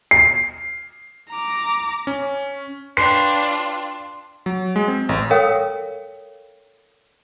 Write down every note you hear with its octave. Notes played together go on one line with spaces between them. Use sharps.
C7
A#5 D6
C#4
D4 F4 B4 C#5 G5 C6 C7
F#3
G#3
C4
A1
A4 A#4 C#5 F5 G5 D#6